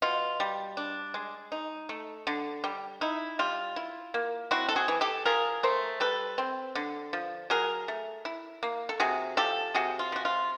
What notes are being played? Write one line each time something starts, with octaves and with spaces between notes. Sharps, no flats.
B2 F4
G3
D4
G#3
D#4
A3
D3
G3
D#4 E4
G3 F4
E4
A#3
C4 E4 F#4
A4
F#4 G#4
E3
G4 A4
F3 G#4 A#4
A3 A#4 C5
G3 A4 B4
C4
D3
F3
F#3 G#4 A#4
A3
E4
A#3
A4
C3 F#4 G#4
F3 G4 A4
C3 F#4 G#4
F4
F3 F#4
F4